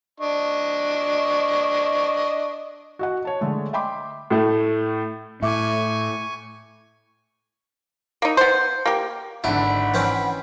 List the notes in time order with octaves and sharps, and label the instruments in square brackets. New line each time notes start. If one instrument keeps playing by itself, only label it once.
[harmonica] D4 D#5 C#6
[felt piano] F#4 D#5 F#5
C#5 A5
D3 G#3 A3
D#5 E5 G5 B5 C6 D6
[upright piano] A2 A3
[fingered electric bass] A2 [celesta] E5 D6 [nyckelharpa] G#5 C#6
[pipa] A#3 D#4
B3 C5
A#3 G4
[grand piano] G#1 D3 [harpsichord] E4 [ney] F#5 [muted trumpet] B5
[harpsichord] E3 C4 C#4